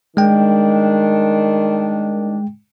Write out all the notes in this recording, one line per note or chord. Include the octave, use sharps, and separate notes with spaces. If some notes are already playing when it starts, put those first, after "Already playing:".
D#3 G#3 D4 G5